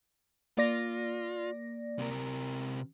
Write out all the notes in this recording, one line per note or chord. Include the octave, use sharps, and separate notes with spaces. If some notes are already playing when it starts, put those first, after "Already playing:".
A#3 F4 D5 A#6
C3 A#4